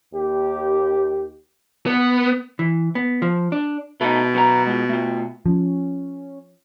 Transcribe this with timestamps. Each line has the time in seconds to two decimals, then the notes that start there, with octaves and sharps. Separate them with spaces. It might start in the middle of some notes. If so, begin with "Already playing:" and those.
0.14 D#2 G4
1.86 B3
2.59 E3
2.95 B3
3.22 F3
3.52 D4
4.01 B2 A3 D#4
4.34 F#2 B3 A#5
4.66 G#3 F4
4.89 A3 F4
5.46 F3 C#4